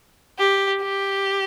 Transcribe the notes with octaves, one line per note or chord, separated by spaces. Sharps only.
G4
G4